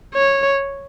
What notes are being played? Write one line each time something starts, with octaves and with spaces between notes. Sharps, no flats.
C#5